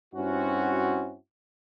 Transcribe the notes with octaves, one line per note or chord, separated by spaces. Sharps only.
G2 C4 C#4 E4 F#4